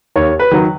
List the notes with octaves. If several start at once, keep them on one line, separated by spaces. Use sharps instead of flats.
D#2 C#5
B4
D#3 F#3